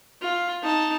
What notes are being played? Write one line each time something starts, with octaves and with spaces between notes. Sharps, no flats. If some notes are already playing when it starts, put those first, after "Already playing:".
F4
D#4 A5